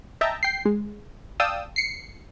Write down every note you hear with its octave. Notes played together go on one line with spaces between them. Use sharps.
D#5 E5 G5 A5 A#5
G5 C7
G#3
D5 F5 G5 A5 D#6 E6
C7 C#7